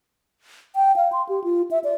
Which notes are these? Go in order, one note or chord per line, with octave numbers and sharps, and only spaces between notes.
G5
F5
C6
G4
F4
E5
D5